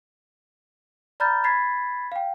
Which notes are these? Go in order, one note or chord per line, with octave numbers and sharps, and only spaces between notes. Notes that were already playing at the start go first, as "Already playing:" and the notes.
D5 A#5 B5 F6 G6 A6
B5 G#6 A6 B6 C7
F5 G5